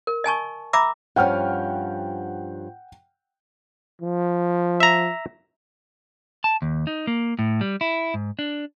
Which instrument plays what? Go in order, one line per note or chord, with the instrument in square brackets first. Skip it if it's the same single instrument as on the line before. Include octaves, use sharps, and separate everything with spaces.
[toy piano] A#4
D#5 G#5 A5 C#6
E5 A#5 B5 D6 E6
[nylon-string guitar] G2 F3 C#4 [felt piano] F#5 G5 F6
[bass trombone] F3
[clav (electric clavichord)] E5 A#5
[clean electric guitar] A5
D#2
D#4
A#3
A2
G3
E4
G#2
D4